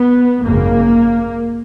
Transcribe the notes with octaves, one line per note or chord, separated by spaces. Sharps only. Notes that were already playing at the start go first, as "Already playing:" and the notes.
Already playing: B3
G#1 F#2 C#3 A#3